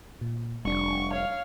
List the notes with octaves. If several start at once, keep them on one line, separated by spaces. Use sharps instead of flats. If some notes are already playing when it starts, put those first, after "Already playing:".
A#2
F1 G3 D4 C#6
C#5 F5